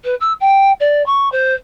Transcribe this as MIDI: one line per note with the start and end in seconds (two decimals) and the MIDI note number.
0.04 0.15 71
0.21 0.33 88
0.40 0.72 79
0.80 1.05 74
1.06 1.31 85
1.32 1.54 72